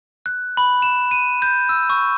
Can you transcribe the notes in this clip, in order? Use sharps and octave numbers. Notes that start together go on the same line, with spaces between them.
F#6
B5
E7
D#7
G6
E6
C#6